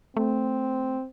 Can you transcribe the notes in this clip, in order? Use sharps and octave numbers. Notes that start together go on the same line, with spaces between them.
A3 C4